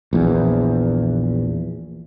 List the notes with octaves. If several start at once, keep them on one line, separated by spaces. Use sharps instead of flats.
A#1 E2